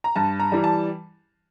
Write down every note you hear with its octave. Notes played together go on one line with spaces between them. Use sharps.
A#5
G2 A5
A#5
E3 G3
A5